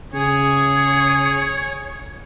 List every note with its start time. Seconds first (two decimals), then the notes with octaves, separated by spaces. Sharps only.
0.14 C#3 G#4 C#5